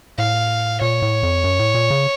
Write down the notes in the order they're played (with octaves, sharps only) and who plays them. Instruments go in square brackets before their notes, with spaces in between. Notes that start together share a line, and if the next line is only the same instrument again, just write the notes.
[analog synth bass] A2 [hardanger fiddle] F5
[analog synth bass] A#2 [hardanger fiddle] C#5
[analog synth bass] A2
F2
F#2
A2
A#2
C#3